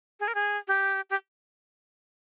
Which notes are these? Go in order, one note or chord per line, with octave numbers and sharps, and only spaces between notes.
G#4
A#4
G#4
G4
G4